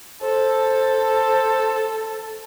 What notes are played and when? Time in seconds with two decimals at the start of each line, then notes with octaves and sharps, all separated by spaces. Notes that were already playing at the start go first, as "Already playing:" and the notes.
0.22 A4 C5